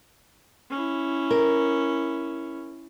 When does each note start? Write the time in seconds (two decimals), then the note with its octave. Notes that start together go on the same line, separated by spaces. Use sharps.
0.70 C#4 E4
1.31 A#4